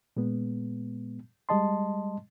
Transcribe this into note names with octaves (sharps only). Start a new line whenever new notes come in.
A#2 G#3 B3
G3 G#3 D#5 A5 C6